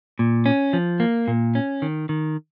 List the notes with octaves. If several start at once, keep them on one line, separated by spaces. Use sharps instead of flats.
A#2
C#4
F3
A#3
A#2
C#4
D#3
D#3